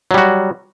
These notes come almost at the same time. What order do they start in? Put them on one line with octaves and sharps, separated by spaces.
F#3 G3 F#4